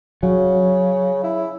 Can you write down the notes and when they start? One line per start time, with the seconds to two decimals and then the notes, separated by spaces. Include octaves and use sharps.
0.23 C#3 F#3
1.24 E4